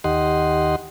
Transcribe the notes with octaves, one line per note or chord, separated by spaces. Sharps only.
D#2 G4 D#5 F#5 C6